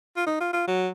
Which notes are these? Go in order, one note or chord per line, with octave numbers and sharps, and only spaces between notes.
F4
D#4
F4
F4
F#3